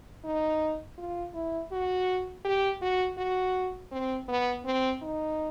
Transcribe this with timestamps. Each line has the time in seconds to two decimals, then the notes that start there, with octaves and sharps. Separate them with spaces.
0.25 D#4
0.98 F4
1.34 E4
1.72 F#4
2.45 G4
2.81 F#4
3.18 F#4
3.91 C4
4.28 B3
4.65 C4
5.02 D#4